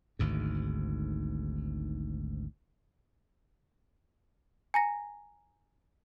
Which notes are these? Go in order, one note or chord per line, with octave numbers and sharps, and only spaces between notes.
G#1 D2 G#2
G#5 A#5 A#6